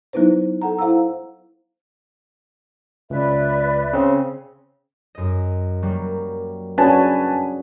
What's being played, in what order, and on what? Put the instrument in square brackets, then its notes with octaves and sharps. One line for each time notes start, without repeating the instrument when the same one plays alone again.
[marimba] F#3 B3 D#4 E4 B4 C5
A4 F#5 A#5
E4 C5 F5 F#5 A#5 E6
[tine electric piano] C#2 [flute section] B4 D5 E5
[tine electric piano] C#3 C4
[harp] F#2 D#5
F#3 G3 A#3
[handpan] C#4 D4 F#4 [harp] G#4 G#6 [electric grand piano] B4 G#5 A5